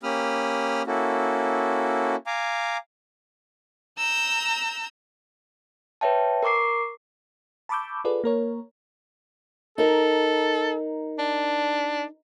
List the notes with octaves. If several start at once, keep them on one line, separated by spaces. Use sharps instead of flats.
A#3 C#4 G4 B5 D#6 F6
A#3 C#4 E4 F#4 A4
F5 G#5 A#5 D6
A#5 E6 G6
B4 C#5 E5 G5 A5
A#4 A#5 C#6 D6 C7
A5 B5 C#6 D6 E6 G6
F4 G#4 A4 B4 D5
A#3 A#4 C#5
D#4 A4 A#4
D4